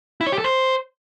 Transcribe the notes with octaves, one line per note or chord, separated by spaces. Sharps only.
E4
C#5
G4
A4
C5